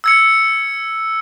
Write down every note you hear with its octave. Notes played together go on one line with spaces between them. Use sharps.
E6 G#6 C#7